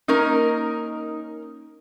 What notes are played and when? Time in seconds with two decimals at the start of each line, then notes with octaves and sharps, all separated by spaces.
0.08 A#3 C#4 D#4 A#4